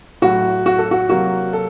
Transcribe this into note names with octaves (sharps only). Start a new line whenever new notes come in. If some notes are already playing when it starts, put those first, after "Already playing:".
A2 F#3 A3 F#4
F#4
A4
F#4
C3 F#3 A#3 F#4
A4